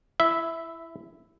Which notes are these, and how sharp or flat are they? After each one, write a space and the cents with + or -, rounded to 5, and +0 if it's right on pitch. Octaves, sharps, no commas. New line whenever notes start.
E4 +15 E5 -5